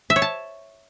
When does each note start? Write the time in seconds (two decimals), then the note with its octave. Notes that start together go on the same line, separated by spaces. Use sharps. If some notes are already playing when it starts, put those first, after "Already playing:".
0.10 E5
0.16 C#5
0.22 A5